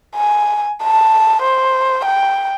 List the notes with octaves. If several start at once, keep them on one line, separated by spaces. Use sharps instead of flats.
G#5
A5
C5
G5